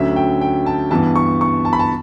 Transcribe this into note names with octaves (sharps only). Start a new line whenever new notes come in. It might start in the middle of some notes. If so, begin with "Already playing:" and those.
Already playing: D2 D3 F#3 C#4 E5
G5
G5
A5
G2 E3 B3 A5
C#6
C#6
A5
B5
A5